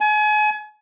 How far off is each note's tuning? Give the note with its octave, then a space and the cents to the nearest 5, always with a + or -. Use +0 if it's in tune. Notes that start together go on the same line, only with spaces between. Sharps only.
G#5 +35